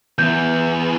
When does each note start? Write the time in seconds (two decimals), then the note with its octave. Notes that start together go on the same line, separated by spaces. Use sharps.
0.19 E2 E3 G6